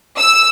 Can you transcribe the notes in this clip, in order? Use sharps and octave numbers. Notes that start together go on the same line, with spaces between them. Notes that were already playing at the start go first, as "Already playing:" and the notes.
E6